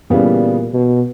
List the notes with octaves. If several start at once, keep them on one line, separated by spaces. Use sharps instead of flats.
A#2 C#3 E3 G3 B3
B2